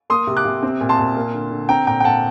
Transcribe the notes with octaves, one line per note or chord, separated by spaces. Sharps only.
A#3 C6 D#6
C3
D6 F#6
C3
C4
A#2
A5 C6
A#2
A#3
D3
D3
C4 G5 A#5
A#2 G5 A#5
G5
A#2 F#5 A5